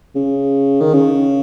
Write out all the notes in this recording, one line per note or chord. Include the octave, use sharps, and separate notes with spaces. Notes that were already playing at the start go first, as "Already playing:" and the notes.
C#3
D#3
C#3